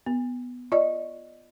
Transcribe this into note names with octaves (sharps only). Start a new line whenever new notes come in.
B3
F4 D5 D#5